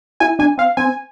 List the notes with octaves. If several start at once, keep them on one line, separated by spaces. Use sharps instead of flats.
E4 G#5
D4 G#5
C4 F5
C4 G#5